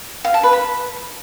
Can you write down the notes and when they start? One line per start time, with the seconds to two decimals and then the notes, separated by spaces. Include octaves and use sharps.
0.25 F5
0.34 A5
0.43 B4
0.53 B5